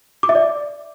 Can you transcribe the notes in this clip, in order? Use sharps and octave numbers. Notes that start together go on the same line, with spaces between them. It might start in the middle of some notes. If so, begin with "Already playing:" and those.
D6
E5
D5